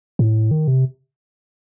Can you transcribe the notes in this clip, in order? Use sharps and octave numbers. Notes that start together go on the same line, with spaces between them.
A2
D#3
C3